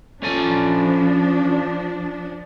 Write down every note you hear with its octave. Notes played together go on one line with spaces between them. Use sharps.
F3 C#4 D4 A4 G#5